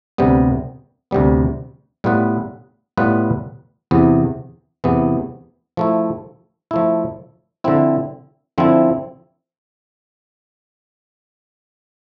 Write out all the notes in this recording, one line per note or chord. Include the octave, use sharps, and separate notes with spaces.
D2 C3 G3 B3
D2 C3 G3 B3
A2 G3 B3 F4 B4
A2 G3 B3 F4 B4
E2 C3 E3 B3
E2 C3 E3 B3
F3 A3 E4
F3 A3 E4
D3 F3 C4 E4
D3 F3 C4 E4